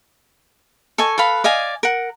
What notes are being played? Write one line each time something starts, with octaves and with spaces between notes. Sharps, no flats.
A4 D#5 G#5 C#6
A4 B4 F5 B5
D5 D#5 F5 G#5
A#4 F#5